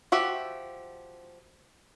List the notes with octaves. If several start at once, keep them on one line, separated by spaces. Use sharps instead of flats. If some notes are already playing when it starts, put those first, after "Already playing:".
F3 F#4 G4 E5